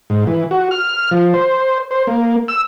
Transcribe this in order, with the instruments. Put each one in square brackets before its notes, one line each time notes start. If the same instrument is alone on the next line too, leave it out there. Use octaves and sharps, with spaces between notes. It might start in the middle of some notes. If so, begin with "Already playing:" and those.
[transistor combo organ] G#2
E3
F#4
F6
F3
C5
C5
A#3
E6